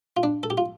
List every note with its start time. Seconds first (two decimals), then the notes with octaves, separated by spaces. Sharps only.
0.17 F4
0.23 D4
0.43 A4
0.50 G4
0.58 F4